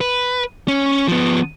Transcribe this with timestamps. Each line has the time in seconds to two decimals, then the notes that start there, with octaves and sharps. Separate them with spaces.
0.01 B4
0.68 C#4
1.08 F3 B3